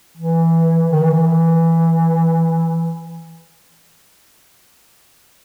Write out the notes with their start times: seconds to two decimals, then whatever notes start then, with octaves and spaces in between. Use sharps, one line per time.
0.17 E3
0.92 D#3
1.02 E3